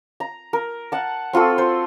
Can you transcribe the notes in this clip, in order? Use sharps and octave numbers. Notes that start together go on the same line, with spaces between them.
A#5
A#4
F#5 A5
C4 F4 F#4 A4
C5